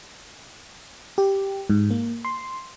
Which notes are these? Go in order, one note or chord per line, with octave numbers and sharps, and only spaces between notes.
G4
G#2
A#3
C6